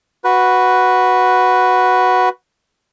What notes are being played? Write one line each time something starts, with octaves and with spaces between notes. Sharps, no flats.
F#4 B4